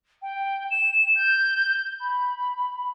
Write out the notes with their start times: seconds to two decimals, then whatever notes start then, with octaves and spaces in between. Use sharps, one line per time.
0.22 G5
0.70 E7
1.15 G6
2.00 B5